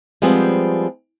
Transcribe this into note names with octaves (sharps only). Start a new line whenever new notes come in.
F3 G3 G#3 B3 C4